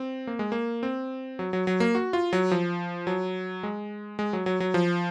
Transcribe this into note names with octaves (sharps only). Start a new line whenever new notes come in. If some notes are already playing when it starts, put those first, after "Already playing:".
Already playing: C4
A#3
G#3
A#3
C4
F#3
F#3
F#3
A#3
F#4
F4
F#3
F3
F#3
G#3
G#3
F#3
F#3
F#3
F3